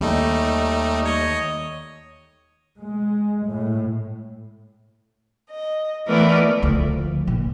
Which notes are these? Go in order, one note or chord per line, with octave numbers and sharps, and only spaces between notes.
D#2 G3 A3 D#4
C#5 D#5
G#3
A2
D#5
E3 A3 B3 A#4 B4 D5
D2 F3
A#2